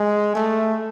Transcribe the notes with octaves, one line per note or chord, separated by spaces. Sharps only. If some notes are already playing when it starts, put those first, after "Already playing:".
Already playing: G#3
A3